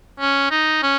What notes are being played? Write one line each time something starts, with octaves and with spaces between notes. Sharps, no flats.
C#4
D#4
C#4